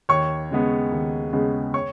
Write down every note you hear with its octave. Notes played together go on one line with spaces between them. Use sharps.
D#2 C#5 C#6
C#3 G#3 B3
D#2
C#3 G#3 B3
C#5 C#6